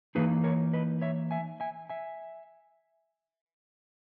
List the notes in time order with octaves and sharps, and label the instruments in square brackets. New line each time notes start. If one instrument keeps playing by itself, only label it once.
[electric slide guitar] E3 A#3 D#4 G#4 B4
A#4 C#5
B4 D#5
C#5 E5
E5 G#5
E5 G#5
E5 G#5